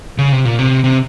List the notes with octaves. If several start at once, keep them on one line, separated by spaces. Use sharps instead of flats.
C#3
C3
A#2
C3
C3